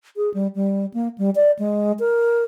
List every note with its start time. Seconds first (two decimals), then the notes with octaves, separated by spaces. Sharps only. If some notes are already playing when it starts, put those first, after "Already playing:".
0.17 G#4
0.34 G3
0.55 G3
0.94 A#3
1.18 G3
1.35 D5
1.59 G#3
1.99 A#4